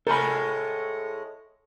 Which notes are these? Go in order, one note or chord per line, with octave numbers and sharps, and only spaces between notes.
A2 G#3 A4 A#4 C5 G#5 B5 G6